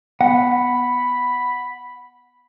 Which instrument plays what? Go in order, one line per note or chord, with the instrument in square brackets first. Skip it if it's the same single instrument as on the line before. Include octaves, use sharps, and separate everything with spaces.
[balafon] B3 [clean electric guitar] F#5 [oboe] B5